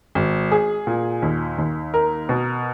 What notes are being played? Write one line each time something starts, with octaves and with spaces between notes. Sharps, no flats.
G#1
G#4
A#2
D#2
D#2
A#4
B2